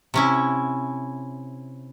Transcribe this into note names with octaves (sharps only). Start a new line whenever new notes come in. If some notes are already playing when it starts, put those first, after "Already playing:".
C3 C#4 E4